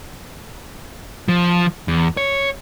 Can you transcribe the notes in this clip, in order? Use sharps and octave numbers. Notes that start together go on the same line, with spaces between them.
F3
E2
C#5